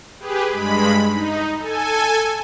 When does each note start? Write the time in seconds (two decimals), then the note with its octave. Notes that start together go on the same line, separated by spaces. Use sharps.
0.20 G4 G#4 B4
0.49 G2 G#3 B5
1.12 D#4
1.58 A4 G#5